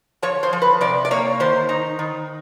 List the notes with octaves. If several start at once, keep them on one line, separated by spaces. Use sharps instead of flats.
F3 C#5
C5
F3
B4
C3 D5
D5
A#3 C#5
D#3 C5
D#4
D#3